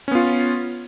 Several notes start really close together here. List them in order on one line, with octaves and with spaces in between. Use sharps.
C#4 B3 F4